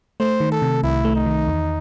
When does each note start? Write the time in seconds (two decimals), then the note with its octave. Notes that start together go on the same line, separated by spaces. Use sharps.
0.20 A3 C5
0.40 D#3
0.52 A4
0.62 C3
0.83 C2 E4
1.05 A3
1.15 D#4
1.26 D#3
1.48 E2